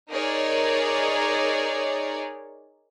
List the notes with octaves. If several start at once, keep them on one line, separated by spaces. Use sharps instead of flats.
D#4 G#4 A#4 C#5 D5